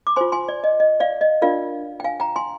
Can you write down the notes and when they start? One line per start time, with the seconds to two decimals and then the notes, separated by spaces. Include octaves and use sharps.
0.07 D6
0.16 F4 C5 G#5 C6
0.32 G#5 C6
0.48 D5
0.64 D#5
0.80 D#5
1.00 D5 F5
1.21 D#5
1.42 D4 F4 A#4 D5 F5
2.00 G5
2.04 F5 G#5
2.20 G5 A#5
2.36 G#5 C6